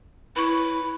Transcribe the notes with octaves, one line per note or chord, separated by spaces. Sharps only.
E4 B4 C#5